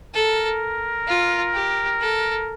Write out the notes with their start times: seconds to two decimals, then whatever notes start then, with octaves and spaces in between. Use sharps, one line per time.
0.14 A4 A#4
1.07 F4
1.54 G4
2.00 A4